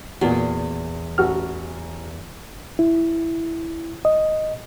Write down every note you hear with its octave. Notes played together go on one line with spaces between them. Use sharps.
E2 A#2 F#4
A1 F#4 F6
E4
D#5